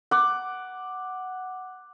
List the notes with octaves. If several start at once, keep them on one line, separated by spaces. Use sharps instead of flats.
F#5 D6